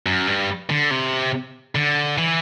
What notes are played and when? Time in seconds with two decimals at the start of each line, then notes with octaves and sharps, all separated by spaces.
0.06 F#2
0.27 G2
0.70 D3
0.91 C3
1.75 D3
2.18 E3